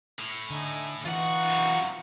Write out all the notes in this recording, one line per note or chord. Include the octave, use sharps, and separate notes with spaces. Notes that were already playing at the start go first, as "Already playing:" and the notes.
A2
D3 A3 D#4 G#5
E3 D#4 F4 B4 F#5 C#6
F#2 C3